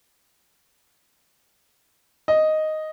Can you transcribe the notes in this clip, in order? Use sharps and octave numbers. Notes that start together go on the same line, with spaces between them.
D#5